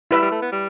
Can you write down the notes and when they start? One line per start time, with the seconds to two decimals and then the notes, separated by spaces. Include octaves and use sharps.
0.11 G3 E4 B4 E5
0.22 G3
0.32 A3
0.42 B3
0.52 G3